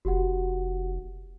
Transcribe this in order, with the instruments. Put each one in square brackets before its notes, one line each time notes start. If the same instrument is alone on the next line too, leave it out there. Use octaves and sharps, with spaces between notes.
[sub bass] F1 [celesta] F#4 G4 F#5